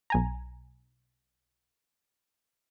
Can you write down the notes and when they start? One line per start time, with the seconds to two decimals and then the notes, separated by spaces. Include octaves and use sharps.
0.10 B1 G#5 A#5